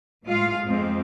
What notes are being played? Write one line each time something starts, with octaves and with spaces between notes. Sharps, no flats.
A2 G#3 F4 F5
F2 G#3 C4